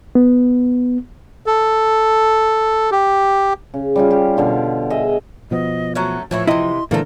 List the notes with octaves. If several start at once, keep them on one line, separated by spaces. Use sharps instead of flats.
B3
A4
G4
C#3
G3 C#4 F4
G4
B2 D3 F4
G#4 D#5 E5 G#5
B2 F3 B3 D#5
F#3 A3 C#4 F#4
A2 E3 F3 E4 C#5
C3 E3 E4 D#5 C6
A#2 D3 E3 F3 A3 A4 A#4